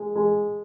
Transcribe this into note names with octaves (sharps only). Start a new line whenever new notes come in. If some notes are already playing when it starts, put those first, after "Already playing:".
Already playing: G#3
G#3